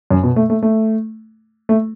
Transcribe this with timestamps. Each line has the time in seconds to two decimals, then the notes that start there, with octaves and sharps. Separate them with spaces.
0.10 F#2
0.23 B2
0.36 A3
0.50 A3
0.62 A3
1.69 A3